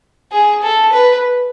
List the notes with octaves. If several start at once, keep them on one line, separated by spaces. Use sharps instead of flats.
G#4
A4
B4